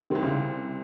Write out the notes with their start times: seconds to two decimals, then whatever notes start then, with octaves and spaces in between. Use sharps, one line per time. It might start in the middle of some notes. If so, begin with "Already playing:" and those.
0.10 C2 C3 D#3 G3 C4
0.23 C#3